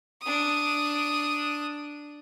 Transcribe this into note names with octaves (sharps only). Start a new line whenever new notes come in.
D4 D#6